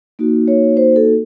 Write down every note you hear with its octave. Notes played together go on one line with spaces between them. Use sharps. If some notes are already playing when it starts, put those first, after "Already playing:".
A#3 D#4 F#4
C#5
C5
A4